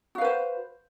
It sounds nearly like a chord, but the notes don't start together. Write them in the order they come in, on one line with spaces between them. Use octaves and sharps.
F#4 F5 B4 C5